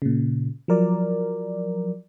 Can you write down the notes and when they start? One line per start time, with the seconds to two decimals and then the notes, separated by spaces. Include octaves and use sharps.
0.02 A#2 C#3
0.68 F3 F#3 A#4 D5